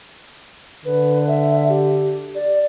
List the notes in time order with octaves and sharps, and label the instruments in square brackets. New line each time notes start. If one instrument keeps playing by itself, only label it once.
[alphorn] D3 [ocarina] B4
[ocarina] E5
G4
D5